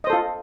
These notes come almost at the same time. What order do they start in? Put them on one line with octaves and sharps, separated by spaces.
D#5 C5 A4 F4